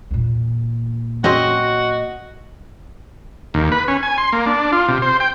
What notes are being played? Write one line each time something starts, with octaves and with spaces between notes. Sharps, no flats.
E2 A#2
F#3 C4 C#4 F#4 D#5
D#2
B4
C#4
G#5
C6
A#3
D4
F4
C3
C5
G5